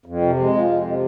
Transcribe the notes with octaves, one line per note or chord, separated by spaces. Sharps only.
F2
C3
G#3
F3
F2
C3